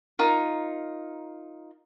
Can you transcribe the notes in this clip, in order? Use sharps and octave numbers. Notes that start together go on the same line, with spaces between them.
D#4 F4 A#4